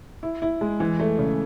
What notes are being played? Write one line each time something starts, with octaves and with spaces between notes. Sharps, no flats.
E4
E4
G#3
E3
A3
C#3